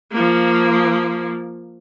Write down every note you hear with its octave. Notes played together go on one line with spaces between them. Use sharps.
F3 A#3